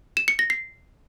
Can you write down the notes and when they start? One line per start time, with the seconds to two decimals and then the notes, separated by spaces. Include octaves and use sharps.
0.17 E7
0.28 C#7
0.39 A#6
0.50 C7